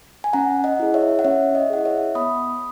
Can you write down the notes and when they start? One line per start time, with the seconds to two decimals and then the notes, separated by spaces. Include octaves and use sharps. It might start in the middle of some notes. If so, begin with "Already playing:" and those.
0.24 G#5
0.33 C#4 F#5 A#5
0.64 D#5 F#5
0.80 E4 G#4
0.94 C#5 E5
1.19 F#5
1.24 C#4 C#5 E5
1.55 D#5
1.70 E4 G#4 F#5
1.85 C#5 E5
2.15 B3 B5 D#6